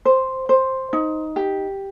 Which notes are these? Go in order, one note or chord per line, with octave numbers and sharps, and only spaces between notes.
C5
C5
D#4
G4